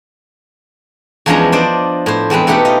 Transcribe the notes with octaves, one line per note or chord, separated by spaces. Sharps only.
E2 F3 G#3 C#4 D4 A#5
D4 C5 D5 D#5
A2 C5
E2 G#3 C4 B4
B2 A3 D#4 G4 F#5
F4 D#5